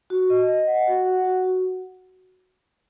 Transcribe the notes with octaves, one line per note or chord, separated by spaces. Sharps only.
F#4
D#5
D#5
F#5
F#4
F#5
F#4
F#4